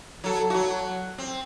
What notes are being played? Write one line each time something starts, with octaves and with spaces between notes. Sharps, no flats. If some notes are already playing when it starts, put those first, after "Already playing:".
F#3 A4
F#3 F#4
C4